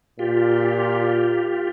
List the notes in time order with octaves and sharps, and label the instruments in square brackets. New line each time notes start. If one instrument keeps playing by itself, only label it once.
[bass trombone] A#2 [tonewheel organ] F4 G4